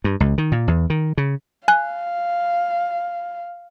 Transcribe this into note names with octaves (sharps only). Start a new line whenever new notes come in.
G2
C#2
D#3
A#2
E2
D#3
C#3
F5 G#5 F#6